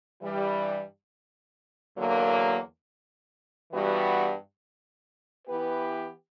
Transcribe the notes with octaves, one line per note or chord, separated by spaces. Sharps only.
G2 E3 G3
E2 D3 F#3 A#3
G2 E3 G3 B3 F#4
E3 B3 E4 G4 B4